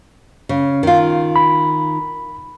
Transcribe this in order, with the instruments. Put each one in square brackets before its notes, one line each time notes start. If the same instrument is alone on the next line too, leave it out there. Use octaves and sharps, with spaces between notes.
[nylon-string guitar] C#3
D#3 F4
[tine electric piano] B5